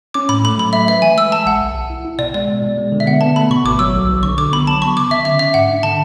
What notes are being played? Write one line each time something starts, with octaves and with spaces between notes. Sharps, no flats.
C#4 D6
A2 B5
A3 B5
F#3 B5
A3 E5
B4 E5
E3 G#5
G#3 E6
G#3 A5
A1 F#5
B1
B1
E4
E4
B2 D5
G#3 D5
B2
B2
G#3
D3
E5
B3 F#5
B3 A5
A3 B5
B2 C#6
G#1 D6
F#3 E6
B1
B1
D3 C#6
D3 D6
B3 B5
F#3 A5
B3 C#6
C#3 D6
D3 E5
C#4 E5
C#4 E5
G#2 F#5
D4
D3 A5